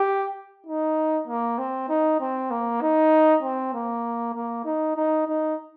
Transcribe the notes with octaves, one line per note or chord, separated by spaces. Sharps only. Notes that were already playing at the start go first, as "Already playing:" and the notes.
Already playing: G4
D#4
A#3
C4
D#4
C4
A#3
D#4
C4
A#3
A#3
D#4
D#4
D#4